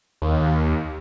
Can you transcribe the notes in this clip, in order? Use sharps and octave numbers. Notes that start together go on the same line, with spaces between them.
D#2